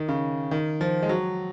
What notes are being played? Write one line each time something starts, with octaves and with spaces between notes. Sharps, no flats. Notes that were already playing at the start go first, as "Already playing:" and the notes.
Already playing: D#3
C#3
D#3
F3
G#3
F#3